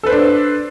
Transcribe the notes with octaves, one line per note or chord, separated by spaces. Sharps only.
D4 A4 B4 C5